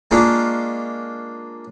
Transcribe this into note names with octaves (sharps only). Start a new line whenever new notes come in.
G#3 A#3 C#4 D4 F4